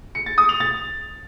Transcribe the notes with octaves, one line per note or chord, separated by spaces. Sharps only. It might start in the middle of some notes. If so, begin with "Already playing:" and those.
C#7
A6
D#6
F7
A6